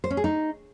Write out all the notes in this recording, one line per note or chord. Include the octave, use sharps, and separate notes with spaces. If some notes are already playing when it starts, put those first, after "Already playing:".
C5
C#4
G#4
D#4